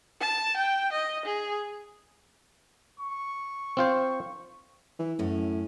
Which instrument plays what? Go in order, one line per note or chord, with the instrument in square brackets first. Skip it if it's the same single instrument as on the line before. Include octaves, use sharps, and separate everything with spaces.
[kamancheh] A5
G5
D#5
G#4
[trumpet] C#6
[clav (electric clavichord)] C4 F4 C5
[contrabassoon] E3
[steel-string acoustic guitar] F#2 C#4 [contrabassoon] A2